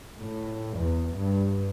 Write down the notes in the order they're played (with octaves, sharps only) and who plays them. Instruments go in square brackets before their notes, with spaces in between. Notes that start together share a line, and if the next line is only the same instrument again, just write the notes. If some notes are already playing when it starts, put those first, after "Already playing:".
[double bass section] A2
E2
G2